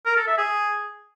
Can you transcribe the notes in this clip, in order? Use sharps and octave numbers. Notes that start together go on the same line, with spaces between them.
A#4
A4
E5
G#4